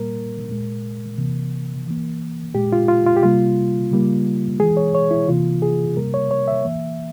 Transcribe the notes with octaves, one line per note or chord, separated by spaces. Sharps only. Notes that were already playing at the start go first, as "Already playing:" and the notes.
Already playing: A#2 G3 A#3 A#4
A#2 G#3
C3 E3 A#3
E3 A#3
A#2 G#3 G4
F4
F4
F4
G4
C3 G3 A#3 F4
C#3 G3 A#3
E3 G#3 G#4
C#5
C#5
E4
C3 E3 A#3 F4
G#4
C3 G3 A#3 A#4
C#5
C#5
E5
E3 A#3